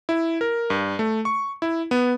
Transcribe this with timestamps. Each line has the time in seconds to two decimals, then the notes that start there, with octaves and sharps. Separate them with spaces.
0.09 E4
0.41 A#4
0.70 G2
0.99 A3
1.25 C#6
1.62 E4
1.91 B3